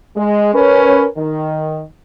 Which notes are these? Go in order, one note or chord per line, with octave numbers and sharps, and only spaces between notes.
G#3
C#4 A#4 B4
D#3